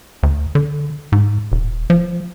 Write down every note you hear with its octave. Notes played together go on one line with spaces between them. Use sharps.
D2
D3
G#2
D#1
F3